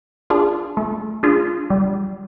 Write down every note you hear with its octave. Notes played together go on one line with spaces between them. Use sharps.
D4 F4 G#4
A3
D4 F4 G#4
G3